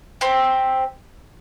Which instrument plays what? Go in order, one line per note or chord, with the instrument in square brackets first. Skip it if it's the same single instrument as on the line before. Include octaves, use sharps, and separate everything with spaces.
[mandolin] C4 G4